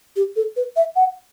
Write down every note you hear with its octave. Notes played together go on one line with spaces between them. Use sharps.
G4
A4
B4
E5
F#5